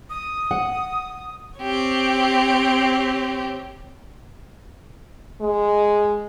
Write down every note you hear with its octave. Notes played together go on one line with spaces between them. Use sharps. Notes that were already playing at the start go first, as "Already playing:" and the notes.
D#6
F#5
C4 G4 C#5
G#3